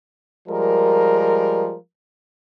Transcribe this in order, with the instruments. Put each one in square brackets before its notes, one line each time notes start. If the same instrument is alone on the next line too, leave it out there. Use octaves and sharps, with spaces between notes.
[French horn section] F3 G3 G#3 A#4